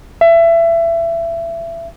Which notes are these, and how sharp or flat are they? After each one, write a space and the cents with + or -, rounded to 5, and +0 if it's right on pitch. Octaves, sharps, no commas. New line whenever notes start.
E5 +25